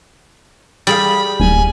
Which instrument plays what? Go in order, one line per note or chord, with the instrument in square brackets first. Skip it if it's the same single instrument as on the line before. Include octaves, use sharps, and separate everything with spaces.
[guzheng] G3 G#4 F5 [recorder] B5
[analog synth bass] D#1 [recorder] G#5